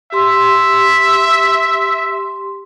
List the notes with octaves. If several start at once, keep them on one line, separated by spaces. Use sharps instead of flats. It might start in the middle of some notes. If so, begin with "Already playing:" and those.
G4 E5 C6